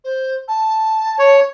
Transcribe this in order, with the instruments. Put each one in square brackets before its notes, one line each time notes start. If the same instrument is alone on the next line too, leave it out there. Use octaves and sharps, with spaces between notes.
[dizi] C5
A5
[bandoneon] C#5